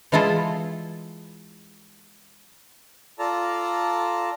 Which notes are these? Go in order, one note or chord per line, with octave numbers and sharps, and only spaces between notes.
E3 G#3 E4 F4 A4
F4 A4 D5 A5 A#5